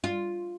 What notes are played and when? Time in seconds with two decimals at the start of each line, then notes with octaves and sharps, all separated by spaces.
0.04 F4